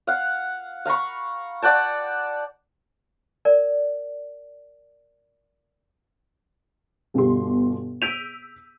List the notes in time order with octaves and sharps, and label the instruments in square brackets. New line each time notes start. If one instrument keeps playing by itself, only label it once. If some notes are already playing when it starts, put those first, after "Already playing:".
[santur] F5 F#5
F5 A#5 B5 C#6
D5 F#5 G5 A5
[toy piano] A#4 D5
[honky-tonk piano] G1 B2 G4 C6
E6 G6 B6 D7 D#7 F7